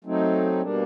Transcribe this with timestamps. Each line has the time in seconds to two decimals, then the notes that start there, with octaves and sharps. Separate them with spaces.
0.04 F#3 A3 C4 D#4
0.61 B2 G3 A#3 D4